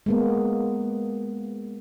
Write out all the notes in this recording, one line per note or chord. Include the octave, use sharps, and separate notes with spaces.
G#3 A#3 B3